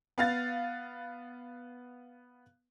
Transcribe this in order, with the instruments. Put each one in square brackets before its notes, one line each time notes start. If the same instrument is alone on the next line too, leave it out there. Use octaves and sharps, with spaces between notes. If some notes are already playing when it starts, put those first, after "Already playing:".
[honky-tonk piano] B3 F5 A6